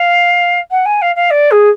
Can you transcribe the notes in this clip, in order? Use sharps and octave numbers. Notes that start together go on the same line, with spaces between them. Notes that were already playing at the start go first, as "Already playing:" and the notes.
Already playing: F5
F#5
G#5
F5
F5
D5
G#4